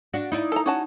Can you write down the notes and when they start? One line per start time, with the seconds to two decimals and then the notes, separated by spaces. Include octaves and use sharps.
0.13 D4 F#4
0.32 D#4 E4 D5
0.52 A4 A#5
0.66 C#4 F#4 A5